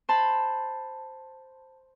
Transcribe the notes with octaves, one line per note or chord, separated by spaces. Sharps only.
C5 A5 B5